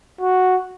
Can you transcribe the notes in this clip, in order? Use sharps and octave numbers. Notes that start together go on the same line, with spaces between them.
F#4